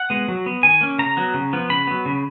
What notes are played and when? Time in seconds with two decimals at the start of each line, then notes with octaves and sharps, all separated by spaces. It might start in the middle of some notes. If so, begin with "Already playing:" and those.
Already playing: F#5
0.10 G#3 B3
0.28 F#3
0.46 B3
0.63 D#3 G#5
0.81 A#3 C#4
0.99 C#3 A#5
1.17 F#3 B3
1.34 C#3
1.53 F3 B3
1.70 C#3 B5
1.87 F#3 B3
2.06 C#3